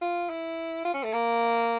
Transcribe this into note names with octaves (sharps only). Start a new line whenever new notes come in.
F4
E4
F4
C#4
A3
A#3